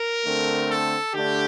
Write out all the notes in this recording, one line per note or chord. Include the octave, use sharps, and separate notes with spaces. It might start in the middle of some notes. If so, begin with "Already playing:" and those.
Already playing: A#4
D3 A3 C4
A4
D3 A3 D4 G4